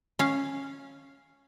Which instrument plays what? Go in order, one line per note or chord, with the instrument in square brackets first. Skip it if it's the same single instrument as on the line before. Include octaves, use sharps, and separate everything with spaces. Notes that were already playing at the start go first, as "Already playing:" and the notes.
[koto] C#4 F5